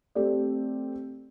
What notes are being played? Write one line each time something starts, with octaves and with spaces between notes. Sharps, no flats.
A3 C4 G4 D5